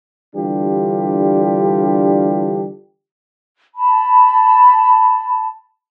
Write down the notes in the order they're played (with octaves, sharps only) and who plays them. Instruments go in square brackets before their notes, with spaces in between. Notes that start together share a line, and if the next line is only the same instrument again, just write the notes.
[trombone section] D3 E3 G3 D4 F4 G4
[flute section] A5 B5